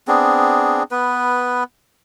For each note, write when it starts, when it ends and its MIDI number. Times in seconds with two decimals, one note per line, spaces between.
0.08 0.83 59
0.08 0.83 60
0.08 0.83 62
0.08 0.83 68
0.91 1.64 59
0.91 1.64 71